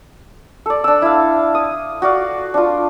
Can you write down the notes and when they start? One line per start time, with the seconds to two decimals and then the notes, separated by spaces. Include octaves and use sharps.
0.66 A4 D5
0.84 D4 E6
1.02 E4 F5
1.55 D#6
2.02 F#4 D5 F5
2.54 D4 F4